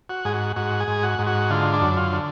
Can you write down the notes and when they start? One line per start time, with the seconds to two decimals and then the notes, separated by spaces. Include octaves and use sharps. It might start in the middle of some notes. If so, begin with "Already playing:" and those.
0.09 F#4
0.25 G#2 G#4
0.33 F#4
0.56 G#2 F#4
0.80 G#4
0.88 G#2
1.03 F#4
1.19 G#2
1.27 F#4
1.50 D3 F4
1.73 D4
1.81 F#2
1.97 F4
2.13 D3